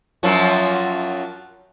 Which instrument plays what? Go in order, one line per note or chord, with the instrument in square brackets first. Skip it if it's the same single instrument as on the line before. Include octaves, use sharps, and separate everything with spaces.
[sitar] F#2 F3 F#3